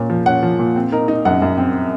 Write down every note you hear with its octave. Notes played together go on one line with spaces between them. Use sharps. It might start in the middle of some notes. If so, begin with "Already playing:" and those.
Already playing: A#2 C#4
F3
C#4 F#5
F3
A#2
C4
D#4 A#4
D#4
F#2 F#5
F#2
C4